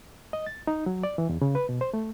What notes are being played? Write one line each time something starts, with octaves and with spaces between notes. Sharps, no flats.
D#5
A6
D#4
F#3
D5
E3
E2
C#3
B4
B2
C5
A3